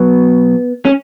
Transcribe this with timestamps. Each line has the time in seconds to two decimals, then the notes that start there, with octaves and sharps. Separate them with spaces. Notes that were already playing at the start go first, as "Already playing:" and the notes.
Already playing: B2 F#3 B3
0.85 C#4